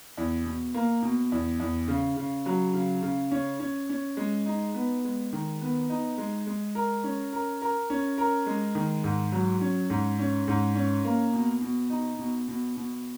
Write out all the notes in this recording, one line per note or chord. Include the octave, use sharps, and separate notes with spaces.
E2
B2
A#3
B2
E2
E2
C#3
C#3
F#3
C#3
C#3
C#4
C#4
C#4
G#3
D#4
B3
G#3
D#3
B3
D#4
G#3
G#3
A#4
C#4
A#4
A#4
C#4
A#4
G#3
D#3
G#2
F#3
C#4
G#2
C#4
G#2
C#4
A#3
B2
B2
D#4
B2
B2
B2